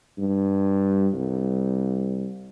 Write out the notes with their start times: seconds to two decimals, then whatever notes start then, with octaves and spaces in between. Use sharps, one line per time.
0.19 G2
1.14 C2